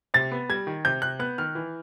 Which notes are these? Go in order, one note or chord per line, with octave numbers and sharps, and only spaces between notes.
C3 A6
B3
G3 G#6
D#3
C3 G6
C3 F#6
B3 F#6
D#3 F6
E3